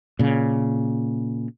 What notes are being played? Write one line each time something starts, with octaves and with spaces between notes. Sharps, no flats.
A#2 C#3